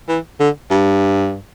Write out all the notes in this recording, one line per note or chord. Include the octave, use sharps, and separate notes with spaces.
E3
D3
G2